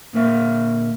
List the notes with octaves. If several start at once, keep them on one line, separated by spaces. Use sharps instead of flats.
A#2 D3 A#3 A#4 E5